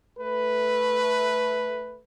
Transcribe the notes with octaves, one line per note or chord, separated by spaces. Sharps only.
A3 B4